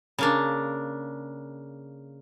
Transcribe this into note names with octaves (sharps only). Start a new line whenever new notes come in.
C#3 A#3 D4